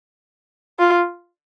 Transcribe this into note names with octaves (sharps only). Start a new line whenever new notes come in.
F4